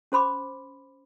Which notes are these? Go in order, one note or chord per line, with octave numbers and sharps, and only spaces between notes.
C#4 C5 B5 C6 D6